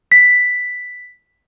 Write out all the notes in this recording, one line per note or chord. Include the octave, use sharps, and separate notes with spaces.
B6